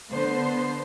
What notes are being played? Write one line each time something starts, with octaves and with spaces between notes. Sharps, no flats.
D3 B3 C5